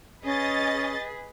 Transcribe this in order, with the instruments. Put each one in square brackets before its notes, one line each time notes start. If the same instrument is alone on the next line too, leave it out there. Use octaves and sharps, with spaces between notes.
[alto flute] C#4 [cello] G#4 B4 [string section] D#5 A6